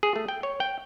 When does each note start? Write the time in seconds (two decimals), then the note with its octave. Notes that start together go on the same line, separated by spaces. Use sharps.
0.03 G#4
0.16 A3
0.28 G5
0.43 C#5
0.60 G5